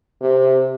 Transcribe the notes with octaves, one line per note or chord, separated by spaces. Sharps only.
C3